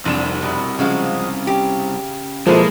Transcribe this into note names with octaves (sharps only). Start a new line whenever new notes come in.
F1 C2 D4 E7
B2 E4
C#3 F3 G#3 F#4
G4
B2 F3 G#3 A#3 E4 A4 C5